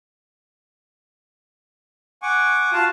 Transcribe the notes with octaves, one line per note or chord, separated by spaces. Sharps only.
F#5 G#5 C#6 D6
F4 F#4 F5 A5